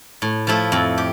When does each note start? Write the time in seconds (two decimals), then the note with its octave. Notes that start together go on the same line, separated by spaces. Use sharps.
0.22 A2
0.47 F3 A3 E4
0.72 F2
0.98 G4